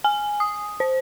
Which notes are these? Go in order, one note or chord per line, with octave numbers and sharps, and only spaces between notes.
G#5
D#6
C5